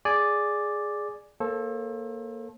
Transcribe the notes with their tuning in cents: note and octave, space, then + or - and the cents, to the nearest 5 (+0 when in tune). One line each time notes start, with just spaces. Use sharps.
G#4 +0 D5 +0 G#5 +0
A#3 +0 A4 +0 C5 +45